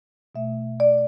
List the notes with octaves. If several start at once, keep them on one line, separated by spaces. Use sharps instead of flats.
B2 A3 E5
D5